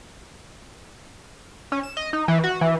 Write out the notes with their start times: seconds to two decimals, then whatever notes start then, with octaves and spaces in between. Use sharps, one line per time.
1.72 C#4
1.83 E7
1.97 D#5
2.13 D#4
2.28 E3
2.44 F#4
2.61 E3